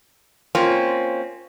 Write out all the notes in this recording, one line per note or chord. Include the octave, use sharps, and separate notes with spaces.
A#3 C4 C#4 F4